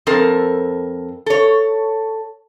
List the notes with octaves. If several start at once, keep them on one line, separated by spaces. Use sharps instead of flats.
F2 C4 A4 A#4
A4 C#5